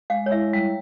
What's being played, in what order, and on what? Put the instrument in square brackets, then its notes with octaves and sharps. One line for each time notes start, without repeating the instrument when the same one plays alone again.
[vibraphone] G#3 [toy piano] F5
[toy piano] C#5
[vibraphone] E4 [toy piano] E5
[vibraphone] G3